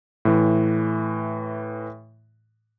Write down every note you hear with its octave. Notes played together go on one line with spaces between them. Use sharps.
A2 E3